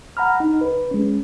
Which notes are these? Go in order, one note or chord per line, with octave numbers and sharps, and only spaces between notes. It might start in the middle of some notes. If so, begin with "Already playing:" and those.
F#5 A#5 B5 F6
D#4
C#2 B4
G#3 C#4